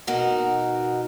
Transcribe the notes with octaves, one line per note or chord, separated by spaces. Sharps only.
B2 D#4 F#4 A#4